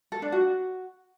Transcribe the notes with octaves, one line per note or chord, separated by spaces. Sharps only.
A4
D4
F#4